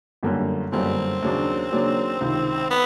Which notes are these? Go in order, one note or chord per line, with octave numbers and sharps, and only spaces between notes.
G1 F#2 D3 G3 A#3
G1 F#2 D3 G3 A#3 C4
D#2 C#3 F#3 A#3 D4
D#2 C#3 F#3 A#3 D4
C#2 C3 D#3
B3